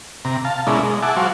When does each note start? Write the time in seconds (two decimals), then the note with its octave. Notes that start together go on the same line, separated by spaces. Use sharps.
0.25 C3 A#5
0.45 F5 A5
0.67 B2 G#3 C#4 E4 A#4 D5
0.83 G#3
1.02 E5 F#5 G#5 A5 D6
1.17 F#3 F#4 C5 F5